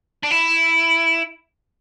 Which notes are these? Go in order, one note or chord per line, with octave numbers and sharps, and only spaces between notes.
D4
E4